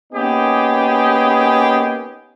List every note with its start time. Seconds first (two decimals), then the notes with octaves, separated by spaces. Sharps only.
0.13 A#3 B3 C#4 D#4 G4 G#4